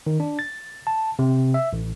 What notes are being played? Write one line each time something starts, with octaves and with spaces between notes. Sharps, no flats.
D#3
D4
A6
A5
C3
E5
A1